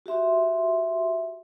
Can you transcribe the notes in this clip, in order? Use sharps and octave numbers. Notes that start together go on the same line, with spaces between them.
F#4 G4 E5 C6